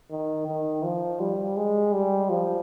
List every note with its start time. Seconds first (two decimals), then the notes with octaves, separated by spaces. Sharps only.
0.11 D#3
0.47 D#3
0.83 F3
1.20 G3
1.56 G#3
1.93 G3
2.30 F3